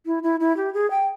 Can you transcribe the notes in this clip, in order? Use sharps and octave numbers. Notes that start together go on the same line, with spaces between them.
E4
E4
E4
G4
G#4
G5